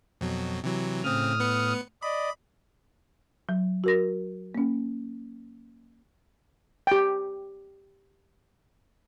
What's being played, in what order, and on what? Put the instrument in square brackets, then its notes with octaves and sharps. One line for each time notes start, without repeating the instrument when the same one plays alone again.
[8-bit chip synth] F2 B2 F#3
C3 E3 F#3
[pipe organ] A2 D#6 F6 [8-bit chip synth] C#3 C4
[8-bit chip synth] B3 B4 C#7
[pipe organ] D5 D#5 [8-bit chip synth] B5
[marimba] F#3
F#4 A#4 A#6
A#3 C#4
[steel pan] G4 G5